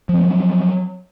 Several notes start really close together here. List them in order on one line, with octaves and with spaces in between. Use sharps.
F3 C4 A3 F#3